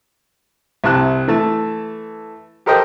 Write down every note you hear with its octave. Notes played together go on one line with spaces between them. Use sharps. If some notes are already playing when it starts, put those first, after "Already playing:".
C2 C3 A5 F#6
E3 A3 A5
G4 A4 A#4 C5 D#5 G5